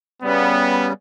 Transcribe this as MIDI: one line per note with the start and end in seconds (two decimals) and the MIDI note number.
0.23 0.93 49
0.23 0.93 55
0.23 0.89 59